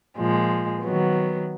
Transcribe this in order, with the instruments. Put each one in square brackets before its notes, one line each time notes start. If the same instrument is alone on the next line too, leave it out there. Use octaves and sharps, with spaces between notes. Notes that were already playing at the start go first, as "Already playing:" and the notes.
[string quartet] A#2 F3 G#3
D#3 F#3 B3